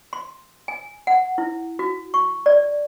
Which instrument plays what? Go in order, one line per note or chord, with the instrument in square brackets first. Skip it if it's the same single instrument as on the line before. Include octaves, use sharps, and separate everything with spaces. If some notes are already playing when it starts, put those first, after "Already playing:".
[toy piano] C6
G#5
F#5
E4
F#4
C#6
D5